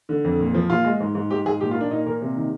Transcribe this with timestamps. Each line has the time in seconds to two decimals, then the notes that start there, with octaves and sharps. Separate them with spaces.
0.09 D3
0.24 F2
0.40 A#2
0.54 F3
0.70 A#2 F4
0.84 G#3
1.00 G#2
1.15 G#2
1.30 G#2 G4
1.46 G#2 G#4
1.60 A#2 G4
1.71 F4
1.75 A#3
1.80 D4
1.90 A#2 D#4
2.06 A#2 A#4
2.21 C3
2.36 D#3